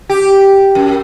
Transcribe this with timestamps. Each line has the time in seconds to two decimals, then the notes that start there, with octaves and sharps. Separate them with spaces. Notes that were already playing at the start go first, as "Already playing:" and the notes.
0.10 G4
0.75 F#2